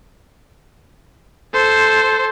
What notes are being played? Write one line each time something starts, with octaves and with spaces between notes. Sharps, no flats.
A4 C5